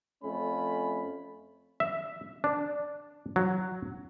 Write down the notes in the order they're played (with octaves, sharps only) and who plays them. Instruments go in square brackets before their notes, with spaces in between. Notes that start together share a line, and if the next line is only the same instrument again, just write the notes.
[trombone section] F2 A3 C#4 [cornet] B5
[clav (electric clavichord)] E5
D4
F#3